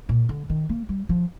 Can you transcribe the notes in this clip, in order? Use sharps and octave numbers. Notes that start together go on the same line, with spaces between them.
A#2
D3
D#3
A#3
G3
F3